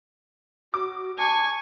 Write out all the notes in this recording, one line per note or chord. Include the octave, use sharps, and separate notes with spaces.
F#4 D6
G#5 A5 C#6